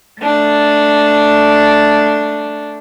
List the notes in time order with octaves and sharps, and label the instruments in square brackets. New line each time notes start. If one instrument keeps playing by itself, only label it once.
[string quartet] A3 D4